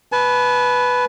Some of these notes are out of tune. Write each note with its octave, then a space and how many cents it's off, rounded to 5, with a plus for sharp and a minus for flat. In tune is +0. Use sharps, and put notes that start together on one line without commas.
B4 +0 A5 -45